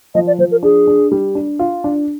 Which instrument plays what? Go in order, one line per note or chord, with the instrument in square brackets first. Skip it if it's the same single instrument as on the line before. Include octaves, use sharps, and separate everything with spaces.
[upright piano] F3 [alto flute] D#5
[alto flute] D5
[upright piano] F3 [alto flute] C5
[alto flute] A#4
[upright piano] D4 [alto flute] G#4
[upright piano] D4
G3
D4
F4
D4